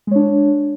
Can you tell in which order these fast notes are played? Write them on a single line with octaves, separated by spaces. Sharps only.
G#3 C#5 D4